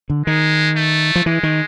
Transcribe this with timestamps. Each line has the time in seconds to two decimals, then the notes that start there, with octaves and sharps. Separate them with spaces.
0.10 D3
0.26 D#3 G#3
0.76 A3
1.15 F3
1.26 E3 G#3
1.43 D#3